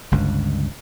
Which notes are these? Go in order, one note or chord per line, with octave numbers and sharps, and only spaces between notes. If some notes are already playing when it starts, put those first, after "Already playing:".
G1 C#2 G2